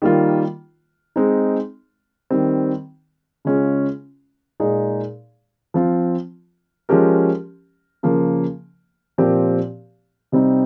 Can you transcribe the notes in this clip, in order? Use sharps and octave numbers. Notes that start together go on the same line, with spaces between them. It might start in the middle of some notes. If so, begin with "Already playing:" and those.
D#3 G3 A#3 F4
G#3 C4 D#4
D#3 G3 C4
C#3 G#3 C#4 F4
A#2 G#3 D#4 G#4
F3 C4 F4
F3 G#3 C#4 G4 A#4
C#3 F3 A#3
A#2 F3 C4 G4 A#4
C3 G3 C4 D#4